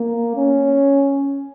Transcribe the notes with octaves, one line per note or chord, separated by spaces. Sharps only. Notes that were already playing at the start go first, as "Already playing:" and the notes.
Already playing: A#3
C#4